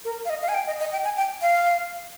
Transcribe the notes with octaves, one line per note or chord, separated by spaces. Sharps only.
A#4
F5
D#5
F5
G#5
G5
D#5
D#5
G5
G#5
G5
F5